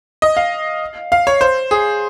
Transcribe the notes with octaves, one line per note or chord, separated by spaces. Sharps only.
D#5
F5
F5
C#5
C5
G#4